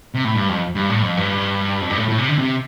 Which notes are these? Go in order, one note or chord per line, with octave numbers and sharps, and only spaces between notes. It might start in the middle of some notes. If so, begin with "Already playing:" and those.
C3
A2
G2
F2
G2
A2
F2
G2
F2
G2
A2
A2
C3
D3
C3